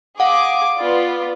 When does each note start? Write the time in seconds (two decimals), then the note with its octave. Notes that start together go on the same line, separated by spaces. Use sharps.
0.20 G#4 F5 F#5 D6
0.77 B3 F4 D5